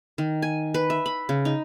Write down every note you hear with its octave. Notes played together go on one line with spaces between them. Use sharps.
D#3
G#5
B4
E5
B5
C#3
D#4